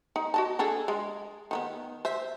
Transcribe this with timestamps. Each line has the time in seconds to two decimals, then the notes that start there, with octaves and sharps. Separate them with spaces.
0.16 D#4
0.34 F#4 D#5 A5
0.59 D4 G#4 A4
0.88 G#3
1.51 D#3 F#3 B3
2.05 C5 E5